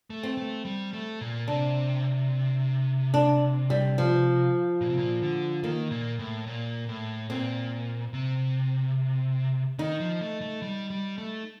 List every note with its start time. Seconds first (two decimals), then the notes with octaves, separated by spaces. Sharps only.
0.10 A3
0.23 C4
0.37 A3
0.65 G3
0.93 A3
1.21 A#2
1.48 C3 D4
3.14 D4
3.70 G3
3.98 F3
4.81 A#2
4.89 C3
4.97 A#2
5.22 D3
5.63 D#3 A#3
5.91 A#2
6.19 A2
6.47 A#2
6.89 A2
7.30 A#2 C4
8.13 C3
9.79 D#3 D#4
10.00 F3
10.21 A3
10.42 A3
10.62 G3
10.90 G3
11.18 A3